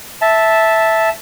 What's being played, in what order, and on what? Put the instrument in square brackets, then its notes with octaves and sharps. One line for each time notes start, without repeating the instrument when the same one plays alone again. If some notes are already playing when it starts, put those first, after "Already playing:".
[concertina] E5 A5